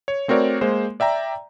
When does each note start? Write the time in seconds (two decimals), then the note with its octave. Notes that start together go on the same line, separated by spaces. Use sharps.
0.08 C#5
0.28 A3 C4 F#4 A#4 C#5 D5
0.61 G#3 A#3 C5
1.00 D5 E5 G5 A#5